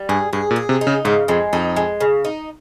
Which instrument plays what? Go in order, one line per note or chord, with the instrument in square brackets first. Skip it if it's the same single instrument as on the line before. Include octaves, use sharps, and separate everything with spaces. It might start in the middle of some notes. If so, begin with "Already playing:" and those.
Already playing: [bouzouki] G3
[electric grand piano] G2 [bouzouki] G#4
[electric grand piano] G2 [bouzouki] G#4
[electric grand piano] A#2
[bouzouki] G#4
[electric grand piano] C3
[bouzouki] D#4
[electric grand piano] C#3
[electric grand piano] G#2 [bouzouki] C#3
[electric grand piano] F2 [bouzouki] G#3
[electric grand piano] F2 [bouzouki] D#4
[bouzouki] G#3
C#3
D#4